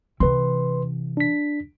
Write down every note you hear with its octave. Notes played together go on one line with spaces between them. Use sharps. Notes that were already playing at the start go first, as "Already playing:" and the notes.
C3 E3 B4 C6
D4 B6